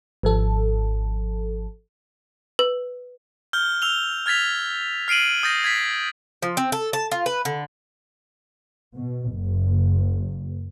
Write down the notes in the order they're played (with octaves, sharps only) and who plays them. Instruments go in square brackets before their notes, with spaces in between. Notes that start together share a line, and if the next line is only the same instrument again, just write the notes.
[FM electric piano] G#1 F3 A4
[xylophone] B4
[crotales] F6 G6 G7
E6 F7 G7
F6 G#6 A6 B6 F7
F6 C7 D7 D#7 F#7
D#6 G6 A6 A#6
G#6 A6 B6
[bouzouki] F3
C4
A4
A5
F4
B4
D3
[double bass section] B2
F#1